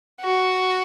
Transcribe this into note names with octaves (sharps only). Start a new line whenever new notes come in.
F#4